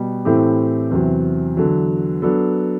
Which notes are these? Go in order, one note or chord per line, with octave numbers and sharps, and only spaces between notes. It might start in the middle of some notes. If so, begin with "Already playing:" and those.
Already playing: B2 G3
A2 E3 A3 C4 G4
E2 C3 F#3 C4
E2 D3 F#3
F#3 B3 D4 A4